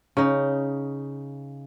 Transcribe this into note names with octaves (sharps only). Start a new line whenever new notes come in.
C#3 D#4